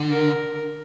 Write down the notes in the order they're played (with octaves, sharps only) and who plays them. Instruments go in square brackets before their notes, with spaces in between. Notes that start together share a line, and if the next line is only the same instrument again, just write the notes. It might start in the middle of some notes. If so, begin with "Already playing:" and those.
Already playing: [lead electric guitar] D3
[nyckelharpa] A#4